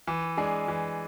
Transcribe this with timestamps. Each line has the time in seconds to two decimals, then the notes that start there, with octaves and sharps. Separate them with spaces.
0.07 E3
0.37 G#3 D4 G#4
0.68 E3